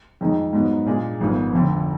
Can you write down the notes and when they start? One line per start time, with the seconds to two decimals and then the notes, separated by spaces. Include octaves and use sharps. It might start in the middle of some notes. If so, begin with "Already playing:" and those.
0.21 F2 D#3 G#3 D#4
0.53 G#2 F#3 B3 D#4
0.86 A#2 G#3 D4 G#4
1.21 G#1 G#2 F3 B3
1.53 F1 F2 D3